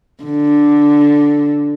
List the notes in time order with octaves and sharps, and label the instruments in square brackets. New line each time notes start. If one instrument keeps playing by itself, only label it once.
[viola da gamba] D3